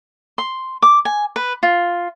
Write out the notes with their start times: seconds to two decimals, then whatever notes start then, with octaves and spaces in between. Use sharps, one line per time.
0.38 C6
0.82 D6
1.05 G#5
1.36 B4
1.63 F4